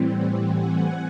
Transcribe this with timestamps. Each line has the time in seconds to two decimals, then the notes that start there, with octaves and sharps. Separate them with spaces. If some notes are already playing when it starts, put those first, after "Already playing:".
Already playing: A2 E3 G3 C4
0.13 F#5 G#5
0.50 F#5 G#5